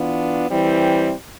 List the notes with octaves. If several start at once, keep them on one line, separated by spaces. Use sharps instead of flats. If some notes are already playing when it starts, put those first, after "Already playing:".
Already playing: E3 B3 D4 F4
E3 G3 C4 E4